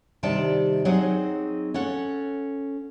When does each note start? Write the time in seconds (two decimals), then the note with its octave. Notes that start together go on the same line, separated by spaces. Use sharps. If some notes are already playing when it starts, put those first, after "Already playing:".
0.23 C3 D#3 G3 D5 G5 A5
0.85 F#3 C4 D#4 G#4 F#5
1.74 C#4 A4 F#5